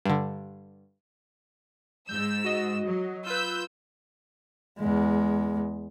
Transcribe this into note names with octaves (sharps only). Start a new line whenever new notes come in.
G2 D3
G#2 E6 G6
F#4 D#5
F#3
F4 B4 E6 G6
E2 G#3